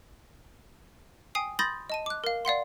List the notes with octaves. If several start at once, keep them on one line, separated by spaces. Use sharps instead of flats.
G5 G#5 D#6 C7
B5 C6 D#6 G6 A6 A#6
D#5 A5 D#7
D6 F#6
A#4 F5
D5 F5 F#5 C6